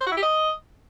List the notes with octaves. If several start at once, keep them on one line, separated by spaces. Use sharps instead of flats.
C5
F#4
E4
G4
D#5